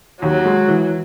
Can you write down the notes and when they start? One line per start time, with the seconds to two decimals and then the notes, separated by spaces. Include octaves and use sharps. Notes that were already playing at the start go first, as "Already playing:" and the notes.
0.22 D#2 F#3
0.45 G#3
0.68 E3